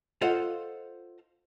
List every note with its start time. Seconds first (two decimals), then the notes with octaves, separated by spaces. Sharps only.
0.21 F4 A4 C5 D#5 F5 F#5